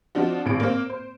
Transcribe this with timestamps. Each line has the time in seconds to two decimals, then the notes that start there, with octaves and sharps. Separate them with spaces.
0.15 F3 C4 D4 D#4 F#4
0.46 G#1 A2 D7
0.60 A#3 C4
0.90 C5